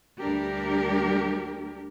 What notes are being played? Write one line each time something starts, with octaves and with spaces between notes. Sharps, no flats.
D2 G3 D4 G4 A#4